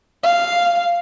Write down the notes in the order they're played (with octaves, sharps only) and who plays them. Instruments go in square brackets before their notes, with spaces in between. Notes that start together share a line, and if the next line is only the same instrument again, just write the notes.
[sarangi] F5